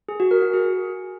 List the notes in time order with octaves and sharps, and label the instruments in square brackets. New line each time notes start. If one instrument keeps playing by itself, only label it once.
[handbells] G#4
F#4
A#4
F#4
G#4